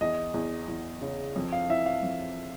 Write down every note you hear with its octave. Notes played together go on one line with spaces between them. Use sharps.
E2 D#5
E2
E2
C#3
F2
F5
E3 E5
F5
F2